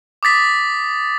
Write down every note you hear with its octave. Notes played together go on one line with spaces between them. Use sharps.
D6 D#6 A6 B6